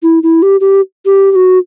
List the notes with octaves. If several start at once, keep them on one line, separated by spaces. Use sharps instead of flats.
E4
E4
G4
G4
G4
G4
F#4